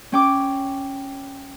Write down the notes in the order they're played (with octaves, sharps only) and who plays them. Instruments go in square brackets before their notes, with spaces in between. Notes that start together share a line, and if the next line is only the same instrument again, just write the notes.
[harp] C#4 G5 D6